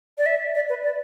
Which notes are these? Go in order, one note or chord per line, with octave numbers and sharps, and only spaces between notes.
D5
E5
D5
B4
D5